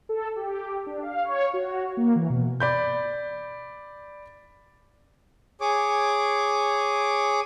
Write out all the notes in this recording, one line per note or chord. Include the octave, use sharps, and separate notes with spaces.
A4
G4
D4
F5
C#5
F#4
A#3
E3
B2
D5 B5 G6
G#4 C#5 D6